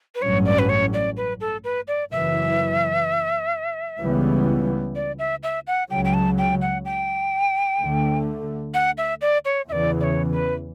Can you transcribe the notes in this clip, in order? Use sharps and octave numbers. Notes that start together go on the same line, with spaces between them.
B4
A1 G2 F#3 C#4 C#5
D5
B4
C#5
D5
B4
A4
B4
D5
F#1 F#2 E3 E5
C#2 C#3 E3 G3 B3
D5
E5
E5
F#5
C#2 C#3 F#3 G5
G5
A5
G5
F#5
G5
D2 D3 A3
F#5
E5
D5
C#5
E2 C#3 E3 D5 E5
D5
C#5
B4